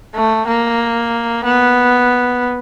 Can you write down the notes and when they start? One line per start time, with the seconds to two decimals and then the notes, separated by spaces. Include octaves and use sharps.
0.15 A3
0.47 A#3
1.45 B3